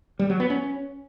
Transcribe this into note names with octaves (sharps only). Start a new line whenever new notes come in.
G3
F#3
B3
C#4